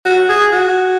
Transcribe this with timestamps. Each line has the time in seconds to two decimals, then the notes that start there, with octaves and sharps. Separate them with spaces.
0.05 F#4
0.29 G#4
0.52 F#4